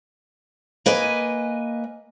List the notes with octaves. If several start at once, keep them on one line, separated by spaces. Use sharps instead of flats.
A#3 B4 D#5 G#5